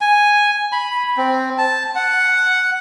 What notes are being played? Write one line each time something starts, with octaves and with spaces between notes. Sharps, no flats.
G#5
B5
C4
A5
F#5